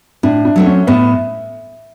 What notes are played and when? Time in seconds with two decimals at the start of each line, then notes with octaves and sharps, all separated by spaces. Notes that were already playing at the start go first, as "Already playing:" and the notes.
0.23 A2 D4
0.45 D4
0.56 F#3 A3 C4
0.66 C#4
0.87 A2 B3